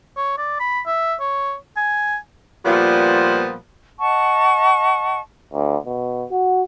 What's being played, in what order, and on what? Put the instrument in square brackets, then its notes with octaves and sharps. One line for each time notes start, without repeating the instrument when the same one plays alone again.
[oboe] C#5
D5
B5
E5
C#5
G#5
[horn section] A#2 F3 G3 B3
[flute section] D#5 F#5 A5 C#6
[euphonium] D2
B2
F#4